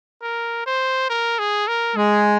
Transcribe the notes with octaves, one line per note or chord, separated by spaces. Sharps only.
A#4
C5
A#4
G#4
A#4
G#3 G#4